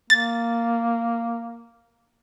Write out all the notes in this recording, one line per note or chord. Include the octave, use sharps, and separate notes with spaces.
A#3 A6